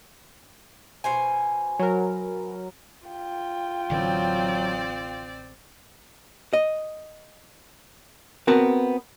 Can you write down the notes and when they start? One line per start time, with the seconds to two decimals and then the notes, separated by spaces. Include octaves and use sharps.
1.04 B2 C5 G#5
1.79 F#3 A#4
3.08 F4 G5
3.90 A1 D3 E3 F#3 C4 D5
6.53 D#5
8.47 B3 C4 F#4 A#4 A5